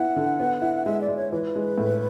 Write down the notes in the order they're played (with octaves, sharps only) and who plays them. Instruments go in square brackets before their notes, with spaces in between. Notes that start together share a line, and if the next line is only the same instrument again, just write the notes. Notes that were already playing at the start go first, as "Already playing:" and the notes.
Already playing: [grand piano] B3 E4 [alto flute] F#5
[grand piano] D3
B3
E4
[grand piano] G#3 [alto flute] E5
[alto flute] D5
[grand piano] G#3
[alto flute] C#5
[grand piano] E3 [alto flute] B4
[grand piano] G#3
A2